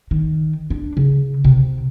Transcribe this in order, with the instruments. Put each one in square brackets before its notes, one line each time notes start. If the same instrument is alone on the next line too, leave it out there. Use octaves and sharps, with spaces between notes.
[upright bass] D#3
D4
C#3
C3